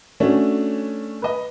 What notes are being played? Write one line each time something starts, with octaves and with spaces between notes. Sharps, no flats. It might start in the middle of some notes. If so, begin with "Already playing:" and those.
A3 C#4 D4 F#4
B4 D#5